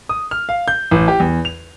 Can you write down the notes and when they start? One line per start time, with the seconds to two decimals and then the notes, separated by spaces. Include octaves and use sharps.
0.09 D#6
0.31 F6
0.49 F5
0.68 G6
0.91 A1
1.08 G4
1.20 E2
1.45 F7